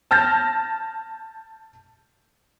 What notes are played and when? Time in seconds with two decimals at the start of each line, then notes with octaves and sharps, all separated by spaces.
0.11 A5 F6 G6 A6 A#6